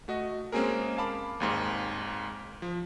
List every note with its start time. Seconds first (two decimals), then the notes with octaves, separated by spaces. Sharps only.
0.08 A3 F#4 D#5
0.52 G#3 A#3 C4 C#4 G#4 A#4
0.98 F5 A5 B5 D6
1.40 G#1 D#2 G#2
2.62 F3